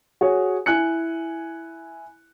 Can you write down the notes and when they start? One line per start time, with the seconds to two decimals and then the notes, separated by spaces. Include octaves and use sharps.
0.21 F#4 G#4 C#5
0.66 E4 G#5 F#6 C#7